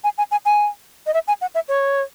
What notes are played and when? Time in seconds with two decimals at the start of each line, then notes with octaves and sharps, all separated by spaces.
0.04 G#5
0.18 G#5
0.31 G#5
0.46 G#5
1.07 D#5
1.14 E5
1.28 G#5
1.41 F#5
1.55 E5
1.68 C#5